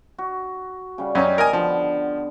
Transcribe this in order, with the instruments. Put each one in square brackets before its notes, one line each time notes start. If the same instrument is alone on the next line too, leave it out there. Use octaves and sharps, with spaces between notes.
[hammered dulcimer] F#4
C#3 G3 F#5
[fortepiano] F#2 C#4 [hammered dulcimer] D#4 F#5
[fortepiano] A#4 D#5 G#5
[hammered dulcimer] D3 B3 [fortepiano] F3